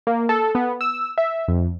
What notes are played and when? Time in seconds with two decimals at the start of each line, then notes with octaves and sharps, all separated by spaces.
0.07 A#3
0.29 A4
0.55 B3
0.81 E6
1.18 E5
1.48 F2